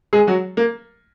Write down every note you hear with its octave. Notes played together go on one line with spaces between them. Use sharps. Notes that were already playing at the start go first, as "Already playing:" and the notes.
G#3 G#4
F#3 F#4
A#3